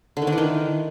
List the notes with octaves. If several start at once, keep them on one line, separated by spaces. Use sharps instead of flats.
D3
D#3
D4
E3
D#3